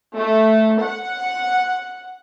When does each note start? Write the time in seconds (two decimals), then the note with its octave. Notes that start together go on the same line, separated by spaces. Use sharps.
0.15 A3
0.80 F#5